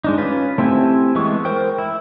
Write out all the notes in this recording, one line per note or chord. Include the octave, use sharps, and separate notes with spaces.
G#3 D4 D#4
C#4 F4 B4
A3 C4 E4 G4 G#5
E3 G#3 B3 C#6
A#4 C5 G5
E4